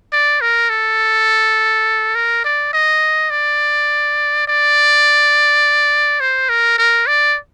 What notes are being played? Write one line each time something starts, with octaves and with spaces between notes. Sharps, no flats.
D5
A#4
A4
A#4
D5
D#5
D5
D5
C5
A#4
A#4
D5